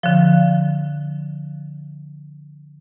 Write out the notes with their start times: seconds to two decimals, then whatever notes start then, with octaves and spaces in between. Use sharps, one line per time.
0.03 D3 F3